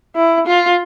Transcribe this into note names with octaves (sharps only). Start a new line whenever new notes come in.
E4
F4